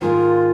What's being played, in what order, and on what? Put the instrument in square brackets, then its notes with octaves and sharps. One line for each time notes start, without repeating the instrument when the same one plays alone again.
[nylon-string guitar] G#2 D#3 G#3 D#4 A#4 [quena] F4